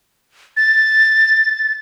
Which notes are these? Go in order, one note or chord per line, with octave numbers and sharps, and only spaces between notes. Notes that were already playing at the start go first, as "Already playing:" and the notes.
A6